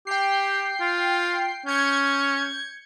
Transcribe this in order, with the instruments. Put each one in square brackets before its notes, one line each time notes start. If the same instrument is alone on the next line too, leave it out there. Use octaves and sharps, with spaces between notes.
[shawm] G4 [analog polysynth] G5 C7
[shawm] F4
[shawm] C#4 [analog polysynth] G6 G#6 C#7